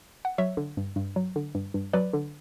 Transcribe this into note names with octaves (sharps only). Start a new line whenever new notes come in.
F#5
F#3 C#5 E5
D3
G2
G2
F#3
D3
G2
G2
F#3 B4 D5
D3